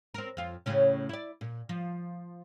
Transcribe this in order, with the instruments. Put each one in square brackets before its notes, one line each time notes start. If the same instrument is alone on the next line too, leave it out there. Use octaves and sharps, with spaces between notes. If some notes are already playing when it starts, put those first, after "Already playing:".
[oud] C4 A#4
F2 F4
A2 C#3 C#4
E4 D5
A#2
F3